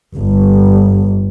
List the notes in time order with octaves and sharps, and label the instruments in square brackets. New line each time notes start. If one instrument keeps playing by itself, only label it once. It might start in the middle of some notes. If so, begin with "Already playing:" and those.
[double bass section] G1